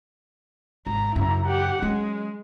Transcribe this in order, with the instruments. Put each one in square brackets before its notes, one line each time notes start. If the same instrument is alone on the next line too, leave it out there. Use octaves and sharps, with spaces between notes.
[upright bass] G#1 [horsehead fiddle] A#5
[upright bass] F#2 C#3 [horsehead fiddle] E4 A#5
[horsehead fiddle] G4 F#5
[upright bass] F#3 C#4 [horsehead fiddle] G#3